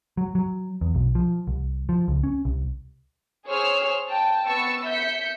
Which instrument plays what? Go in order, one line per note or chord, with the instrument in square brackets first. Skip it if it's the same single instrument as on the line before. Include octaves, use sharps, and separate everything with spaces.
[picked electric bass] F#3
F#3
E2
B1
F3
C2
F3
C#2
C#4
C2
[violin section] G#4 C5 C#5 E6 F6
G5 A5
B3 C#6 E6 A6
E5 G6 B6 C#7